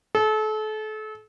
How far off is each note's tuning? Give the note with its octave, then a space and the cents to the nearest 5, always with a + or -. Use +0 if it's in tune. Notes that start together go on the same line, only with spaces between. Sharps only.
A4 -35